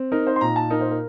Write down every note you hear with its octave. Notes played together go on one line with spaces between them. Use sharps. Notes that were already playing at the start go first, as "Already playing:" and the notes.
Already playing: C4
D#4 A#4
C5
C6
A#2 A#5
A5
D#4 A#4
C5
A#4